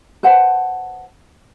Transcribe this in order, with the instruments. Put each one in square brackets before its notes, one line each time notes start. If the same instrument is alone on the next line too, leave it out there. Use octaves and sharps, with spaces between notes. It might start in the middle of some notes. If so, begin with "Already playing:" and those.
[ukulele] B4 C5 F#5 A5